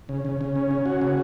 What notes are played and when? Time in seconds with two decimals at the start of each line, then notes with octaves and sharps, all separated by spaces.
0.09 C#3
0.25 C#3
0.41 C#3
0.56 C#4
0.71 C#4
0.86 F#4
1.01 C#3